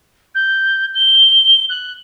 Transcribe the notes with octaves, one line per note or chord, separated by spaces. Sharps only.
G6
G7
F#6